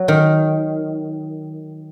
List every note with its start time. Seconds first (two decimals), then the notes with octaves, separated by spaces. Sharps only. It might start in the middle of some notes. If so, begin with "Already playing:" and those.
Already playing: F#3
0.08 D#3